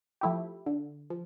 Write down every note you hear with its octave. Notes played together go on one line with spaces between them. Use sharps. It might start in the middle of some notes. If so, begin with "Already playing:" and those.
F3 A3 E4 G4
D3
F3